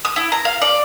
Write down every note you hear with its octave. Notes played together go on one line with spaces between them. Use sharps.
D#6
E4
A#5
F5
D5